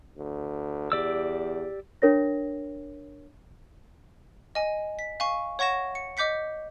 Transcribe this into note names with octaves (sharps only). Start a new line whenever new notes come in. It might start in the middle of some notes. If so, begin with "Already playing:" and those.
D2
E2 G4 D5 E6
D4 A#4 C#5 A#6
D#5 G#5
B6
F5 G#5 C#6
C#5 F#5 C#6 A#6 E7
C#7
D#5 D6 G6 B6 C#7